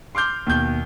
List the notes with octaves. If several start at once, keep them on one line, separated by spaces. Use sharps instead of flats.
C6 D6 F6 G6
D#2 B2 G6